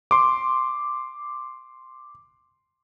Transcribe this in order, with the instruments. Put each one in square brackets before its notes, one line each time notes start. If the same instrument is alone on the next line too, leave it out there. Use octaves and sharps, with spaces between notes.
[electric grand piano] C6 D6